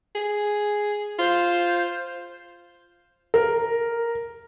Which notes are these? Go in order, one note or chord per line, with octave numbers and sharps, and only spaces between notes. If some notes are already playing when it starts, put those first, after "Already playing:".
G#4
F4 C5
A#4